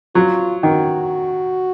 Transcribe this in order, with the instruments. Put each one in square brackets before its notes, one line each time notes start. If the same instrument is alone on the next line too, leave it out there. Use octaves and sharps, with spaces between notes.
[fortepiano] F#3 [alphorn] F4
[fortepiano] D#3 [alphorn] F#4